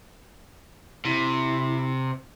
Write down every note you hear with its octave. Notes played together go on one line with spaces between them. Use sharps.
C3 E4